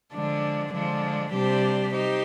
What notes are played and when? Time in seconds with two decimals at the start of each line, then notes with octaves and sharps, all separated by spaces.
0.13 D3 F3 G#3 D4
0.73 D3 F3 G#3 D4
1.33 C3 G3 D4 G4 C5
1.94 D#4 G4 C5